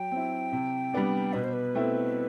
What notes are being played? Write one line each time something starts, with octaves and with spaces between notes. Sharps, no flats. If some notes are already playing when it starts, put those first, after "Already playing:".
Already playing: F#3 G5
C4 E4
C3
G3 B3 D4
B2 B4
C5
B4
A3 C4 E4